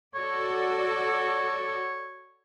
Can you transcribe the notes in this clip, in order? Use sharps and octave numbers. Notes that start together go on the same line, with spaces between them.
F#4 A4 C#5 D5